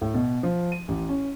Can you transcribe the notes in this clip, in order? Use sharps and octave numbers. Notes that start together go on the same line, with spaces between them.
A2
B2
F3
D#7
A1
C#4